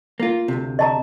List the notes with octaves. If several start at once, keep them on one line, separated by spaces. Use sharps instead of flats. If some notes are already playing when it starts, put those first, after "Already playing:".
A#3 F4
D2 C3
D#5 A5 A#5